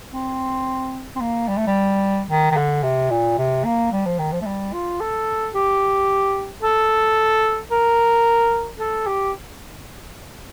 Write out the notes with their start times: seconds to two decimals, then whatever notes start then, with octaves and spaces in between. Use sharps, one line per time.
0.12 C4
1.16 C4
1.21 A#3
1.48 G3
1.58 A3
1.67 G3
2.29 D#3
2.51 D#3
2.57 D3
2.83 C3
3.10 A#2
3.38 C3
3.65 A#3
3.92 G3
4.06 F3
4.19 D#3
4.32 F3
4.42 A3
4.46 G3
4.73 F4
5.01 A4
5.54 G4
6.63 A4
7.71 A#4
8.79 A4
9.07 G4